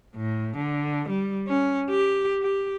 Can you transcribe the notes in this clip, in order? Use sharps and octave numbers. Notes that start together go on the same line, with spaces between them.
A2
D3
G3
C#4
G4
G4